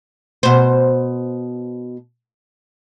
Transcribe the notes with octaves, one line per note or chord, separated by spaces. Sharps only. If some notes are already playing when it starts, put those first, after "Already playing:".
B2 C5